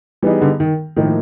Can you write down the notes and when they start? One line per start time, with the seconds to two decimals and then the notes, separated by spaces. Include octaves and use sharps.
0.22 E3 G3 B3 D#4 G#4
0.42 D3
0.60 D#3
0.96 A2 D#3 F3 A#3 D#4